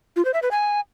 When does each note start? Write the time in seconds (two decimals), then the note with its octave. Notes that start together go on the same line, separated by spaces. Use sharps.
0.16 F4
0.25 C5
0.34 E5
0.42 B4
0.51 G#5